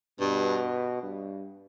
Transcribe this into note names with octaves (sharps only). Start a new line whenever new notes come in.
G2 B2
G2